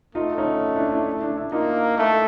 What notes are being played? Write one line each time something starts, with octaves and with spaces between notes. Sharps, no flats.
A3 D#4 F4
C#4 D#4
D4 E4
D4 E4
D4 E4
D4 E4
A#3 D#4 F4
A3